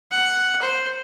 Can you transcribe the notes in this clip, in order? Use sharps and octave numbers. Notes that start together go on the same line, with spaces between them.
F#5
C5